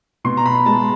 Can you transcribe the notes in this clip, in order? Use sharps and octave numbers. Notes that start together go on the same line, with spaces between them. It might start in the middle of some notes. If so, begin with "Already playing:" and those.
B2 C6
A#5
B5
G#3 A5